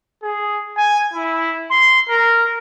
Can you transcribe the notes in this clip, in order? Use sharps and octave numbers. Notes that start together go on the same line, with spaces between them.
G#4
G#5
E4
C6
A#4